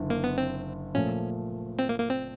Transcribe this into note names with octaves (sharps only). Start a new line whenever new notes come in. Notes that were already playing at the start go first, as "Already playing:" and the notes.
Already playing: F#1 D3
A#3
B3
C4
A#2 F3 A3 C#4
C4
A#3
A#3
C4